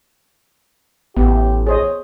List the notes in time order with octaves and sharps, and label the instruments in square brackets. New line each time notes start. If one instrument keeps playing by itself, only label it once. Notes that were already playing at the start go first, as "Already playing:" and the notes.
[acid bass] A1 [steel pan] B3 [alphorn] G4
[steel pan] G#4 C5 D#5 [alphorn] C#5